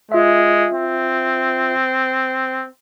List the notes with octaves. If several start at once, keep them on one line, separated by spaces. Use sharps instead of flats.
G#3 F4 E5
C4